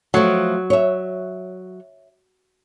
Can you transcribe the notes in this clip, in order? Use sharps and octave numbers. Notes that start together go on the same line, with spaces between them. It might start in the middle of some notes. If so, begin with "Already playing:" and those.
F3 F#3 A3
C#5 E5